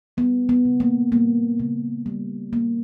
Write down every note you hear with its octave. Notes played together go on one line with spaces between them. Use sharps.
G3 B3
B3
C#3
A#3
G3 A#3
C#3
G3
A#3